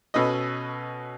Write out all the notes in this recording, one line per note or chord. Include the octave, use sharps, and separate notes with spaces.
B2 C#4 A4 B4 D#5